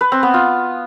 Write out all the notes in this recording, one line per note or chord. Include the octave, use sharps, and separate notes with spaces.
B4
C4
B3
F4